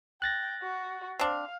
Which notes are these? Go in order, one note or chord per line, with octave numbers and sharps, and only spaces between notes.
G5 F#6 A6 A#6
F#4
C4 D4 F5